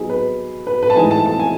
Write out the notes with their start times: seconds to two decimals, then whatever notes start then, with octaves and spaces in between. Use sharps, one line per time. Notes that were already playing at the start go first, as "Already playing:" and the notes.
Already playing: F#3 B3 D#4 G#4
0.10 B4
0.67 B4
0.83 B4
0.90 A5
0.96 A2 E3 G#3 D#4 G#5
1.11 A5
1.26 A5
1.40 G#5